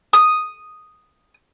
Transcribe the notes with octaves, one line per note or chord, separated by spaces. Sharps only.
D#6